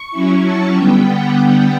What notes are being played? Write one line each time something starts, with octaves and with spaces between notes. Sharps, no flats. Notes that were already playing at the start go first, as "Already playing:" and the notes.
Already playing: C#6
F#3 C#4 E4
A5
D3 G3 B3 G5
F#5